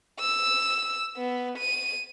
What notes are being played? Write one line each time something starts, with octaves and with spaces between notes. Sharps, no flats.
E6
B3
D#7